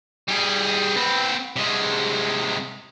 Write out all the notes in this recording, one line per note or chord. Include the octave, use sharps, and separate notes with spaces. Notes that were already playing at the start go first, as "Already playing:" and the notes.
G3 G#4
C4 B4
C3 G#3